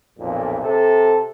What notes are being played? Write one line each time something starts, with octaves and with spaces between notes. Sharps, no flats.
B1 F2 A#2
C3 A4